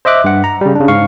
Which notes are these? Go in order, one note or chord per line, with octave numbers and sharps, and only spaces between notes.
C5 D#5 E5 D6 F#6
G2 F#5
A#5
C#3 G3
C#3 D4
G#2 F5 C#6